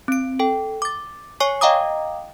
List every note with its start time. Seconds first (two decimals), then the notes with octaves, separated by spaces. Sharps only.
0.08 C4 D7
0.39 A4 G5
0.82 D6 A6
1.40 C#5 G#5 C#6 C7
1.61 D#5 F5 G5 A#5 D6 D#6